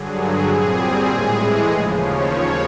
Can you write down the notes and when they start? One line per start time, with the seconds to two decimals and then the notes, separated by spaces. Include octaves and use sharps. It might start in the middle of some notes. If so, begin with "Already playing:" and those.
Already playing: G2 D3 F#3 G#4
0.18 G#4
0.48 A#2 G3 C4
0.78 G#4
1.08 A2 E3 G#3
1.38 G#4
1.67 D#2 C#3 F3
1.97 C#5